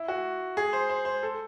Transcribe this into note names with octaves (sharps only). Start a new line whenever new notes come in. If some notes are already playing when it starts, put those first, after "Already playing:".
Already playing: E4
F#4
G#4
C5
C5
C5
A4